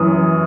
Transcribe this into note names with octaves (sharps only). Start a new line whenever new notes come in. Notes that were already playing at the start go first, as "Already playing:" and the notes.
Already playing: F#2 E3 D#6